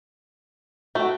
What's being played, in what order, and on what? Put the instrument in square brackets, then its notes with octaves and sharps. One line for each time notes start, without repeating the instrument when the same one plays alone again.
[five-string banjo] A3 [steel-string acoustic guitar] F#4 G5